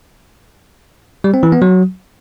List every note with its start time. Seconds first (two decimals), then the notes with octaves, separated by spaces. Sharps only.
1.24 G3
1.34 C4
1.43 E3
1.52 B3
1.62 F#3